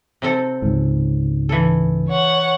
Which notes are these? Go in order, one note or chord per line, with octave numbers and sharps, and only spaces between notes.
C3 C4 A4
C#2 G#2
E3 A4
C#5 F#5